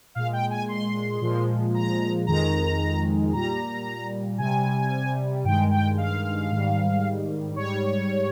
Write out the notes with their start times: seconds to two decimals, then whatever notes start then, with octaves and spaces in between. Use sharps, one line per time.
0.15 A#2 G#3 F5
0.33 G5
0.50 G#5
0.68 C6
1.21 A#2 F3 G#3
1.74 A#5
2.27 F2 D#3 G#3 A#5
3.33 A#2 G3 A#5
4.38 C3 G3 G#5
5.44 G2 D#3 G#3 G5
5.70 G5
5.98 F5
6.51 G#2 D#3 G3
7.56 G#2 G3 C#5